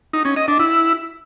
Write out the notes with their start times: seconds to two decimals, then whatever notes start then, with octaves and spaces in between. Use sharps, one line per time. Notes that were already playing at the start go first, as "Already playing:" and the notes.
0.13 D#4
0.25 C#4
0.36 D#5
0.48 D4
0.59 E4